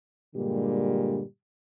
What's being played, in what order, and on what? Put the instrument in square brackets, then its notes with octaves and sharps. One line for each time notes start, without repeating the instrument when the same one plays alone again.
[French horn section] G2 A#2 D3 G3 G#3 G4